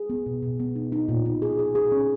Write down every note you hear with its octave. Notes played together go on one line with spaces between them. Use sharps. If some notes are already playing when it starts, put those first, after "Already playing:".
Already playing: G#4
B3
B2
B2
B3
D#4
D#4
A#2
D#4
G#4
G#4
G#4
C#4